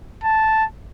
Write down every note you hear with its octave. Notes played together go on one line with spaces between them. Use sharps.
A5